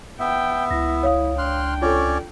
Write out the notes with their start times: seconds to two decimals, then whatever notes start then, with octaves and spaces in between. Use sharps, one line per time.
0.20 B3 E5 G5
0.71 C#2 E4 A#6
1.03 C#5 F5 D#6
1.38 D4 G5 C6 F6 F#6
1.82 C#4 F4 A4 C#5 D5